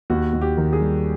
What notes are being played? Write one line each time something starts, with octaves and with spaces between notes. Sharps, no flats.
D#2 F#4
D#2
G4
D#3
G#4
G3